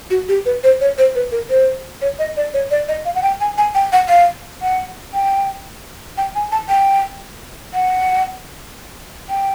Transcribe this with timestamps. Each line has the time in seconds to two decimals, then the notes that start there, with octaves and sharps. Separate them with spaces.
0.10 F#4
0.29 G4
0.46 B4
0.64 C5
0.81 C#5
0.98 C5
1.15 B4
1.32 A#4
1.50 C5
2.02 C#5
2.19 D#5
2.37 D5
2.54 C#5
2.71 D5
2.88 D#5
3.05 F5
3.15 F#5
3.23 G5
3.41 G#5
3.58 G#5
3.75 G5
3.92 F#5
4.09 F5
4.62 F#5
5.14 G5
6.18 G5
6.35 G#5
6.52 A5
6.69 G5
7.74 F#5
9.29 G5